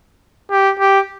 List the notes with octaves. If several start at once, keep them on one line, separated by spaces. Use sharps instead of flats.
G4
G4